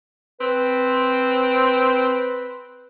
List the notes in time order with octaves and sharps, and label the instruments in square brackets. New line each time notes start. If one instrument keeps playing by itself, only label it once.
[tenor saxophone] C4 [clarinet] B4